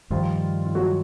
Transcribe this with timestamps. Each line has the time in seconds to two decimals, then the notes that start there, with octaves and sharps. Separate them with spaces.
0.10 G2 D#3 F3 G3 F4
0.65 F4
0.75 F#3 F#4